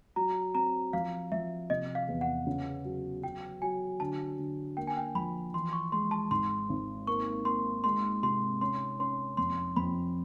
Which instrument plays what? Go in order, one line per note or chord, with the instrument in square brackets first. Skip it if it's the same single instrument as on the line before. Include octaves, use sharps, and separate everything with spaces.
[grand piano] F#3 [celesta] A#5
[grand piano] C4 [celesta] A#5
[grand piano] F3 [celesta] F5
[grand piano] F3 [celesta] E5
[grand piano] C3 [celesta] D#5
[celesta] F5
[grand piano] E2
[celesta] F#5
[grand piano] C#3
F#3
[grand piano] F#3 [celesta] G5
[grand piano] F#3 [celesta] G#5
[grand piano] D3 [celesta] A5
[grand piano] D3
[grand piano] A#3 [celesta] G5
[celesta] G#5
G5
[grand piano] F3 [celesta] B5
[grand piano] E3 [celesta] C6
[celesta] C#6
[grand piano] G#3 [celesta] C6
[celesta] A5
[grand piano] G#1 [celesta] C6
[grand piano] G#1
[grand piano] A#3 [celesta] C#6
[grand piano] A#3 [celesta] C6
[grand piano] G#3 [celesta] C6
[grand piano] C3 [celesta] C6
[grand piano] C#4 [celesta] C6
[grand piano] C#4 [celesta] C6
[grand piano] F2 [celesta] C6
[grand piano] F2 [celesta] B5